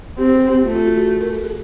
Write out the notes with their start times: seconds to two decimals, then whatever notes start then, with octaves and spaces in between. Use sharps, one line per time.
0.18 C4 G4
0.34 G#4
0.49 G4
0.64 A3 F4
0.75 F4
0.86 F#4
0.98 G#4
1.21 A#4
1.33 A4
1.44 G#4